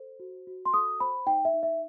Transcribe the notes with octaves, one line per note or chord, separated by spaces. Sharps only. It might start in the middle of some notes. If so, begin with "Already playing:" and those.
Already playing: A4 C5
F#4
F#4
C6
A4 D#6
C5 B5
D#4 G5
E5
D#4
E5